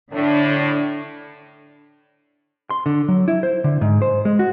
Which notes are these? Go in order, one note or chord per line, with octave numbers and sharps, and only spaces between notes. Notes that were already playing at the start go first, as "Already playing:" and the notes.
A2 D3 D4
C6
D3
F#3
E4
C5
D3
G#2
C5
G#3
F#4